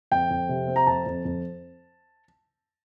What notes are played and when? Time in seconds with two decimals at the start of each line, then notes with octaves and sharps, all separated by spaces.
0.11 F2 G5
0.30 F2
0.49 C3
0.68 C4
0.76 A#5
0.87 F2 A5
1.06 F2
1.25 F2